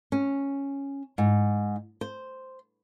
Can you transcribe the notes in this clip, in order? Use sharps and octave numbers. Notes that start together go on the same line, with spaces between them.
C#4
G#2
C5